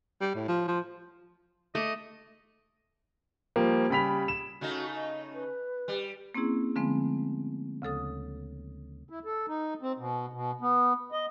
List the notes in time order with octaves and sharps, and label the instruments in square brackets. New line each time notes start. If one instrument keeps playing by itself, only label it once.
[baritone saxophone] G3
A2
F3
F3
[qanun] A3 D6 [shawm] D#5
[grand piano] F3 G3 A#3
C#3 G3 B5 B6 F7
E7
[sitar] C#3 A3 D#4 [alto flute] F#4
[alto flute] D#5
B4
[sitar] G3
[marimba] A#3 C4 C#4 E4 G#4
D3 F3 G#3 A3 B3 C4
D2 C#3 A4 D#6
[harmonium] E4
A4
D#4
C4
B2
B2
B3
D#5